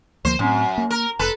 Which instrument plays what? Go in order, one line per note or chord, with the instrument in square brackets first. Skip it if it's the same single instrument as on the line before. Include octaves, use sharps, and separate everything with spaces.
[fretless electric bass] D2 F3 A#3 [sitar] C5
[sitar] F#2 [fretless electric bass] A2 C4
[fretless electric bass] A#3
[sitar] A#4
[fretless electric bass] F1 [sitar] A4 B4